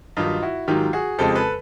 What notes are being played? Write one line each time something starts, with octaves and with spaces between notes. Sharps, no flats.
G2 D#3 F#3 D#4 F4
E4 F#4
G#2 D#3 F#3 F4 G4
F#4 G#4
F2 C#3 F3 G#3 G4 A4
A4 B4